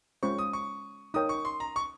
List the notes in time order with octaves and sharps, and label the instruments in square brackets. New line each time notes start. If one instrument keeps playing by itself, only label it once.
[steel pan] G#3 C#4 F4 C5 [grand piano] C#6
[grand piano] D#6
C#6
[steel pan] D#4 A#4 C#5 G5 [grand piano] D#6
[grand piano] C#6
C6
A#5
C#6